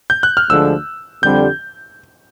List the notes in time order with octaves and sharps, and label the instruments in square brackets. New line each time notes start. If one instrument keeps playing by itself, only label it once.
[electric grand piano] G6
F#6
F6
[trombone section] D2 D3 F3 G#3 [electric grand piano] E6
[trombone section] F2 D3 G3 C4 [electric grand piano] G6